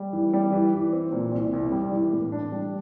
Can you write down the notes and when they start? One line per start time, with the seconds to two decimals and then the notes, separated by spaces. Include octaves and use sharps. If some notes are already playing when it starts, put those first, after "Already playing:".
Already playing: G3
0.13 E3
0.33 G3
0.52 E3
0.73 E3
0.92 C4
1.12 A#2
1.32 C2
1.53 C2
1.72 G3
1.92 E3
2.13 A2
2.32 D4
2.52 G3